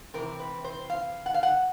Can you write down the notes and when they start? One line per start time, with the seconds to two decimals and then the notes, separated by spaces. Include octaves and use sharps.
0.14 C3 E3 C4 A#4
0.40 B4
0.65 C5
0.90 F5
1.26 F#5
1.34 F5
1.43 F#5